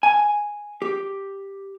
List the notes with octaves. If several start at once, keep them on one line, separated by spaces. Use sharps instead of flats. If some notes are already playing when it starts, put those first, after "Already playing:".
G#5
G4